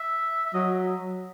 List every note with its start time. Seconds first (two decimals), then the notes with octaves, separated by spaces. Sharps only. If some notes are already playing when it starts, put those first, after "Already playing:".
Already playing: E5
0.46 E5
0.54 F#3 D#5